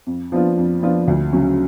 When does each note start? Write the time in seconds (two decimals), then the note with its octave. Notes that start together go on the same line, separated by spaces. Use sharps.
0.07 F2
0.32 F3 B3 D4 F4
0.57 F2
0.83 F3 B3 D4 F4
1.08 D2
1.33 C#3 F#3 C#4